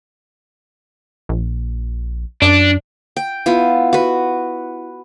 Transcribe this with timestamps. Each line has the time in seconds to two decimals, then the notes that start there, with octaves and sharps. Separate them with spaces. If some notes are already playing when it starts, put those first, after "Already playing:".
1.29 A#1
2.42 F#2 D4
3.17 G5
3.46 B3 E4 F4
3.93 F#4 B4